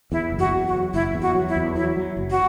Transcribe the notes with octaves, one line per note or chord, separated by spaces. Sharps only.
E2 E4
F#1
F#4
E2
F#4
F#3
F#1 E4
E2
F#4
F#3
E4
E2
F#3 E4
F#3
F#1
F#4